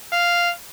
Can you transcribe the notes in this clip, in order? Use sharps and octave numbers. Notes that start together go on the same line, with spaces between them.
F5